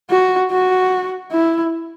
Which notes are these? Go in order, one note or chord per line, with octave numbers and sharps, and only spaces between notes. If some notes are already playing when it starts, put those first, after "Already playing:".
F#4
F#4
E4